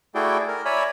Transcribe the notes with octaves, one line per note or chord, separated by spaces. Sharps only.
A3 E4 F#4 G#4 D5 G5
A#4
C#5 D5 E5 G#5 A#5 B5